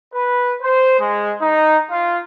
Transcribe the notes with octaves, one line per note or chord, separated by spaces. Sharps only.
B4
C5
G#3
D#4
F4